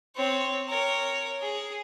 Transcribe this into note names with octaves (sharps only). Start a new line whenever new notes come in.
C4 C#5
A#4 C#5
G#4